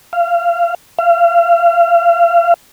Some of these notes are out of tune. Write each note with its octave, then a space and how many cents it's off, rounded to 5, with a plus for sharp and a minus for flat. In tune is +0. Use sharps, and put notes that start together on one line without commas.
F5 -25
F5 -35